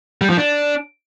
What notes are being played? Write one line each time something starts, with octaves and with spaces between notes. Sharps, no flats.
G3
F3
D4